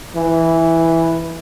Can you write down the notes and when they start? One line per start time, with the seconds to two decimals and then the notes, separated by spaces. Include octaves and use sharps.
0.16 E3